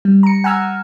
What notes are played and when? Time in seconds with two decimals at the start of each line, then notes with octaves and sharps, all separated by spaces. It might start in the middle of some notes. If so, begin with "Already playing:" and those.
0.05 G3
0.23 A#5 C#7
0.44 F#5 G#5 A#5 E6 F6 G#6